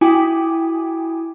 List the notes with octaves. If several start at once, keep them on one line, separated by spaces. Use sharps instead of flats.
E4 F#4 G5 G#5 D6 D#6